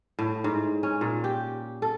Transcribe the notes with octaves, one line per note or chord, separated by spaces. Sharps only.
A2
G#2
C#4
A#2
G4
A4